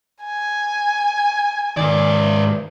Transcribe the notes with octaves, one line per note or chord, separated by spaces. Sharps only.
G#5
G#2 D#3 D5